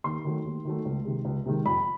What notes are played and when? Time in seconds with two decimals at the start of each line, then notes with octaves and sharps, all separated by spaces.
0.04 D#2 C6
0.24 D#3 F#3 A3
0.45 D#2
0.65 D#3 F#3 A3
0.85 C#2
1.05 C3 D#3 G#3
1.25 C#2
1.46 C3 D#3 G#3
1.66 F2 B5